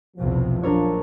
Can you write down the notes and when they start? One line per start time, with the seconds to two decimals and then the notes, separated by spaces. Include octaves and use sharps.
0.17 B1 E2 C3 F3
0.63 A#1 F#3 D4 A#4 C#5